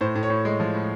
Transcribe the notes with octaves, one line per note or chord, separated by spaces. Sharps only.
A2 C5
A2
C#5
A2
G#3
F3
A2